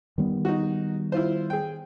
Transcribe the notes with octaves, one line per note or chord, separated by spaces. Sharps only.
D#3 G3 B3
D#4 F#4
E4 F4 C5
G#4 G5